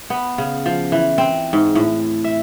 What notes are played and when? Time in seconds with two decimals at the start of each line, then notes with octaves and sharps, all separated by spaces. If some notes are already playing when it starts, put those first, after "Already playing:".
0.10 B3
0.38 C#3
0.66 F3
0.92 E3
1.18 C4
1.53 G#2
1.75 A2
2.24 E5